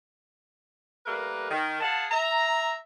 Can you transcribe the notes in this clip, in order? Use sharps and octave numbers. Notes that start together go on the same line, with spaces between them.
G3 A3 A#3 A#4 B4
D#3
G#4 F5 F#5 A5
E5 A#5